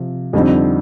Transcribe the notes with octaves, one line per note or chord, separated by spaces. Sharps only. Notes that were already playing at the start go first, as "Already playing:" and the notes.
Already playing: C3 F3
F2 D3 G3 C4 D#4